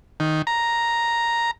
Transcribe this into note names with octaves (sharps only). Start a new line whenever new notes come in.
D#3
A#5